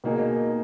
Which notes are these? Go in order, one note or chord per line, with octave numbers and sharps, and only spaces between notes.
B2 A#3 D#4 G#4